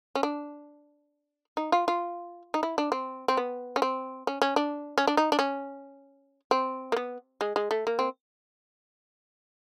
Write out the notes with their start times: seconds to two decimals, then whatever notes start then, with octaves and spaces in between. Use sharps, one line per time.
0.15 C#4
0.23 D4
1.57 D#4
1.72 F4
1.88 F4
2.54 D#4
2.63 E4
2.78 D4
2.92 C4
3.28 C4
3.37 B3
3.76 C#4
3.82 C4
4.27 C#4
4.42 C#4
4.56 D4
4.98 C#4
5.07 D4
5.17 D#4
5.32 D4
5.39 C#4
6.51 C4
6.92 A#3
6.96 B3
7.41 G#3
7.56 G#3
7.71 A3
7.87 A#3
7.99 C4